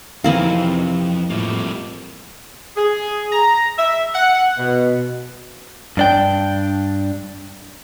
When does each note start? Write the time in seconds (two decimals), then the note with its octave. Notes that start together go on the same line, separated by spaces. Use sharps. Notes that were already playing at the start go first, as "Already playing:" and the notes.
0.24 F2 C3 E3 C4 D#4 E4 A#4 F5
1.30 F2 A2 G3 A#3
2.76 G#4
3.32 A#5
3.77 E5
4.14 F#5
4.58 B2
5.97 G2 D4 G5